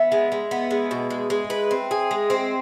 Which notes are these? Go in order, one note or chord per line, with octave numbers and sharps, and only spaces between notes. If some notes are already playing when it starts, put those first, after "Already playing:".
Already playing: B3 E5
G#3
G#3
B3
G#3
B2
G#3
G#3
B4
C4
G#4
G#3
C4